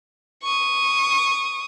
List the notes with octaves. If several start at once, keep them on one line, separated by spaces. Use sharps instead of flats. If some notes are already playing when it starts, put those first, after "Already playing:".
C#6 D#6